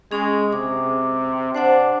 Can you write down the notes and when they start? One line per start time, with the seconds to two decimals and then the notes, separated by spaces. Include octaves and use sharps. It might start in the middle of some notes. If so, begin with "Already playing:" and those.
0.12 G#3 C#4 G#4
0.53 C3 D6
1.55 D4 C5 F#5 D6